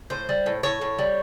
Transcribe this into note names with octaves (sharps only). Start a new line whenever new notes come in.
A2 C5
G3
A2
A2 C#5
A2
G3